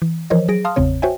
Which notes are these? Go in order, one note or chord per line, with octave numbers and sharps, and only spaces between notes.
E3
E3 F3 A#4 C5 C#5 D#5
F#3 G#4 A#6 D7
F5 A5 C6 D#6 F6
G#1 E2 C#3 C4 C#5
F#4 C5 C#5 E5 G5 G#5